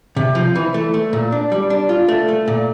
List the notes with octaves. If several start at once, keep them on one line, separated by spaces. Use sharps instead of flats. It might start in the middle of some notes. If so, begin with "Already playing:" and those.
C3
F3
E3
A3
A3
A#2
D4
G3
D4
F4
A3
A3
A#2